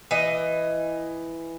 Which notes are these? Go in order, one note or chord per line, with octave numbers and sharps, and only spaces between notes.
E3 D#5